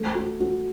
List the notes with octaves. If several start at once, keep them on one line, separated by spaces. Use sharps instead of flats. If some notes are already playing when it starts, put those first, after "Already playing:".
Already playing: A3
F#4
F#4